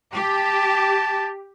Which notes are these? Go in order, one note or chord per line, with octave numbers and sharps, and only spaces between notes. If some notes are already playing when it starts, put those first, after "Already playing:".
G4 A5